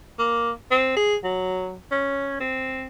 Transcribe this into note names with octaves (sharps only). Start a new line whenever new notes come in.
A#3
C4
G#4
F#3
C#4
C4